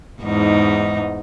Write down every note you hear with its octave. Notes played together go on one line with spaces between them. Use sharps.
E2 G#2 D#4